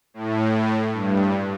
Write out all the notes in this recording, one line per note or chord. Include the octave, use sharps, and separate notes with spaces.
A2
G2